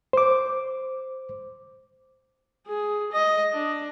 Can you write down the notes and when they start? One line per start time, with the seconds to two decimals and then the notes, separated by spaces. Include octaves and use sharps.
0.13 C5 D6
2.67 G#4
3.13 D#5
3.53 D4